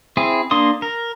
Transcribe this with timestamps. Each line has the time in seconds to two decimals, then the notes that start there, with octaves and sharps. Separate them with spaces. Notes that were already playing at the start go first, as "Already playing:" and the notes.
0.17 C4 E4 G#4
0.51 A#3 D4 C6 D#6
0.82 A#4